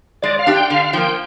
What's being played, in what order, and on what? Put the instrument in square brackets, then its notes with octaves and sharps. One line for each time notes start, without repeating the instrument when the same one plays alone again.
[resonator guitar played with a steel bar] G#3 [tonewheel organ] D5
[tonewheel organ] F5
[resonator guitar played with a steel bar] D4 G4
[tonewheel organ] G5
[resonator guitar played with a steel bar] D3 [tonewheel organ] F5
[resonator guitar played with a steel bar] F3 A#3 [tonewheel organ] G5